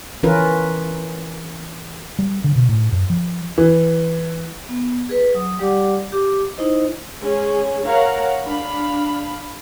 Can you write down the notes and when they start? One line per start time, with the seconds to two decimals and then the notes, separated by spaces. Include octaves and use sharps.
0.23 E3 C#4 F4 A#4 B4
2.19 G3
2.44 D3
2.55 B2
2.69 A2
2.92 F#2
3.10 F3
3.58 E3
4.69 B3
5.09 G#4 B4
5.34 F#3 D#6
5.59 G3 G4 D5 F#5 D6
6.12 G4 D6
6.57 D#4 E4 C5 D#5
7.20 G#3 C#4 G#4
7.85 A#4 C#5 F5 F#5 A#5
8.44 D4 F5 B5